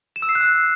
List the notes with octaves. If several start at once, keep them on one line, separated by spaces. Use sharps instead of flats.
E7
E6
C7
F#6